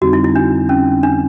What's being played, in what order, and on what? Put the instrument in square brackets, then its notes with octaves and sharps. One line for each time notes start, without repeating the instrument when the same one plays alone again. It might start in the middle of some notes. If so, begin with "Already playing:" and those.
[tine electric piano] F2 D3 G3 C4 D#4 [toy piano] F#4
[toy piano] E4
E4
D4
C#4
D4